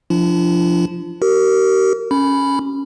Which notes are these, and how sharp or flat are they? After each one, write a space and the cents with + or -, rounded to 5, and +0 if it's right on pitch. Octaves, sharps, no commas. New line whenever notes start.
F3 +0 D4 +0 F4 -40
G4 -45 A#4 -15
C#4 +0 B5 +0